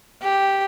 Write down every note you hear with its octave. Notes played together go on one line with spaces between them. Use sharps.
G4